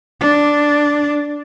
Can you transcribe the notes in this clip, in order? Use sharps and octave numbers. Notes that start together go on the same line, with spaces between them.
D4